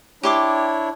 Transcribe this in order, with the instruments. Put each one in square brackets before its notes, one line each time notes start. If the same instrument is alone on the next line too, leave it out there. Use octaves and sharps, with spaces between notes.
[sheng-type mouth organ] D4 E4 C#5 [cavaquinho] G4 C6 D6